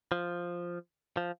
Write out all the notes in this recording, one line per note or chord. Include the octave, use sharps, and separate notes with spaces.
F3
F3